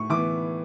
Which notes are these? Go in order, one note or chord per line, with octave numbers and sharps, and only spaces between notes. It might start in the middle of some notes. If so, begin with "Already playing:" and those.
Already playing: A2 C#6
E3 B3 D6